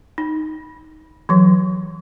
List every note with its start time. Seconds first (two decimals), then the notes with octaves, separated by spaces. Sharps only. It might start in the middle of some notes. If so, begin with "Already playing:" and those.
0.18 D#4
1.29 E3 F#3